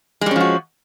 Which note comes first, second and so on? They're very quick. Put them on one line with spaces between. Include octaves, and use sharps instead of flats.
G#3 G3 C#4 F3 F#4